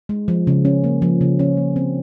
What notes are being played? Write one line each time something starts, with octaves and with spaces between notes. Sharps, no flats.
G#3
F3
C#3
C#4
A#3
F3
C#3
C#4
A#3
C4